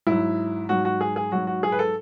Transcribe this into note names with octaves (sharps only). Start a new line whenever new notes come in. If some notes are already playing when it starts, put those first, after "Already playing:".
G#2 F#3 E4
G#2 F#3 F#4
F#4
G#4
G#4
G#2 F#3 F#4
F#4
G#4
B4
A4